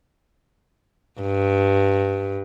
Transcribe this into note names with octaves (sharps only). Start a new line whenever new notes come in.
G2